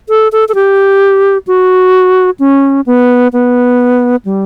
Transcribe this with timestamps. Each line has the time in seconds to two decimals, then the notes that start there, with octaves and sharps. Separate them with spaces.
0.09 A4
0.32 A4
0.49 A4
0.55 G4
1.47 F#4
2.40 C#4
2.86 B3
3.33 B3
4.25 G3